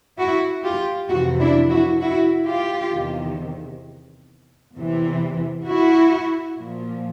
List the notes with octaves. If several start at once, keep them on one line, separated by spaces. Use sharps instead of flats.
E4 F#4
F4 G4
F2 C3 E3 E4 F#4
D4 E4
E4 F#4
E4 F#4
F4 G4
E2 C3 D#3
E2 C3 E3
E4 F#4
A#2 F3